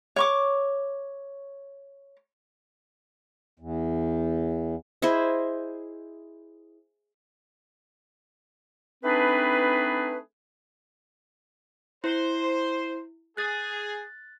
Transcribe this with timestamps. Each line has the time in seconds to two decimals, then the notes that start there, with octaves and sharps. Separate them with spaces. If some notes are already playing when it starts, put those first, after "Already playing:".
0.16 C#5 C#6 D6
3.60 E2
5.02 E4 G#4 C5 D#5
9.03 A3 C4 D4 D#4 G#4 B4
12.04 E4 C5
13.37 G#4 F#6 A6